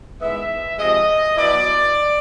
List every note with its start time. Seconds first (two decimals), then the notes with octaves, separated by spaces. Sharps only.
0.20 D#3 G#3 B3 E4 E5
0.79 C3 F3 G#3 D#5
1.37 B2 F#3 B3 E4 D5